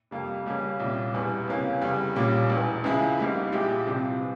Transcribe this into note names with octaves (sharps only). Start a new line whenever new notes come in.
F2 C3 G3 A#3
C#2 C#3 G3 A#3 C#4
C2 A#2 G3 C#4
E1 E2 E3 G3
C#2 C3 E3 A#3 C#4
F1 E2 C#3 G3
A#1 A#2 G3 A#3 C#4
E1 E2 E3
C#2 C#3 F3 G#3 E4
G#1 G#2 G3 A#3
A#1 A#2 G#3 E4 G4
C2 C3 F3 C4
E3